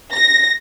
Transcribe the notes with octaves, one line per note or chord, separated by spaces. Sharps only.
A#6